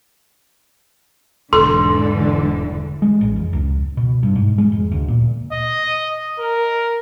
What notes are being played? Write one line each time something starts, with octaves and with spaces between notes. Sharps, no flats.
E1 G#2 D3 E3 A4 C6
G#3
A1
F1
C#2
B2
G2
G#2
G#3
F1
D2
A#2
D#5
A#4